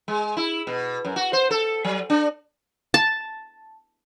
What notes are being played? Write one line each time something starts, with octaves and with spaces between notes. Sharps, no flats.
G#3
E4
B2
F#2
F#4
C5
A4
F#3
D4
A5